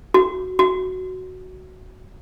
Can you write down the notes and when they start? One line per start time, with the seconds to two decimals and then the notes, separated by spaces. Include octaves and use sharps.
0.14 F#4
0.59 F#4